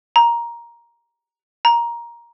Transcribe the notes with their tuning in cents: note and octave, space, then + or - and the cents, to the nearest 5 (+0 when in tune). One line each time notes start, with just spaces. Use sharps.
A#5 +10
A#5 +15